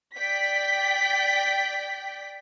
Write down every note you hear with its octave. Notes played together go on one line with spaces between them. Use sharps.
D5 G5 B6